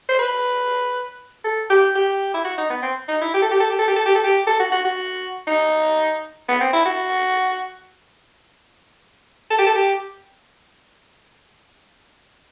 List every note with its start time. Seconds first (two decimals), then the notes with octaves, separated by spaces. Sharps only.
0.09 C5
0.19 B4
1.44 A4
1.70 G4
1.95 G4
2.34 E4
2.45 F#4
2.58 D#4
2.70 B3
2.82 C4
3.08 D#4
3.21 E4
3.34 G4
3.42 A4
3.51 G4
3.60 A4
3.70 G4
3.79 A4
3.87 G4
3.96 A4
4.06 G4
4.15 A4
4.24 G4
4.47 A4
4.60 F#4
4.72 F#4
4.85 F#4
5.47 D#4
6.48 B3
6.61 C4
6.73 E4
6.85 F#4
9.51 A4
9.58 G4
9.66 A4
9.75 G4